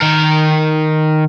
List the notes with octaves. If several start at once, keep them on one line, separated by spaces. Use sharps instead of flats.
D#3 A#4